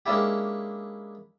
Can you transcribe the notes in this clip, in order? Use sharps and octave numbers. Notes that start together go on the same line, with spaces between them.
G#3 A#3 C#4 D4 E4 G4